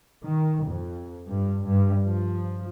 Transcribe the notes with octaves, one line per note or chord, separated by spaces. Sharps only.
D#3
F2
G2
G2
F3